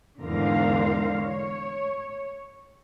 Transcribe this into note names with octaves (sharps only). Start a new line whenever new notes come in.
E2 G#2 D3 A#4 C5 F5
C#5